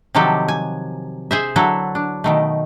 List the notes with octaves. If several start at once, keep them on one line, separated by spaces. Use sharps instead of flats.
C3 D#3 F3 F#3 G4 A4
G#5
G#4 C5 E5
D3 F#3 E4 A4
D4
B2 D#3 A3